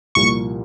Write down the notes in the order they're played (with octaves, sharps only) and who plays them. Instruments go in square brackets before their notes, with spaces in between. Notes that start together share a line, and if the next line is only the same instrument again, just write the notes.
[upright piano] C2 A#2 F3 A#3 [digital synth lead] C#6